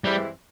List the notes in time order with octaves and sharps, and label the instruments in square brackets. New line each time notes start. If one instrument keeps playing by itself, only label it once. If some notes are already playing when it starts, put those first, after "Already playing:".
[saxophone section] G2 E3 G#3 C4 E4 [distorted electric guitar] G3